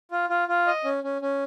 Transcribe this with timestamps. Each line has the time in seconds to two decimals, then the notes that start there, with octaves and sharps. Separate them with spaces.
0.11 F4
0.30 F4
0.48 F4
0.67 D#5
0.84 C#4
1.04 C#4
1.22 C#4